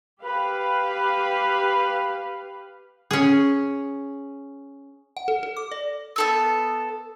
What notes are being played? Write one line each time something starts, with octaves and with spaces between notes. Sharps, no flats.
G4 B4 F5
C#4 G#4
F#5
A4
A4
D6
D5
B3 A4 E6